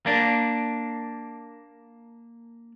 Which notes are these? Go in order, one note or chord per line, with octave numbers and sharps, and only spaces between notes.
A#3 D4